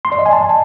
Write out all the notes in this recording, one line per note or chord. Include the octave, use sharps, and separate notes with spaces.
C6
D5
D#5
G#5
A5